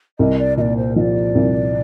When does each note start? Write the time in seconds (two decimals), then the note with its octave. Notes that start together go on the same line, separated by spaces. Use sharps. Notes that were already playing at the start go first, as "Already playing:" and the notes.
0.19 C2 D#5
0.39 D5
0.57 A#2 D#5
0.61 D5
0.77 C5
0.96 F3 D5 D#5
1.35 C2